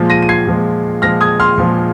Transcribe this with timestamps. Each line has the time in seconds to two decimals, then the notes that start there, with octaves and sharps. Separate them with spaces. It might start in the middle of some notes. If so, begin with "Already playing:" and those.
Already playing: A#2 F3 G#3
0.10 A#6 D#7
0.22 D#7
0.29 G#6 C7
0.47 A#2 F3 G#3
1.02 A#2 F3 G#3 F6 A#6
1.21 D#6 G#6
1.40 C6 F6
1.58 A#2 F3 G#3